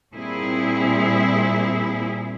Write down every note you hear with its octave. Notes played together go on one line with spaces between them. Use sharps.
A#2 G3 C4 E4 G#4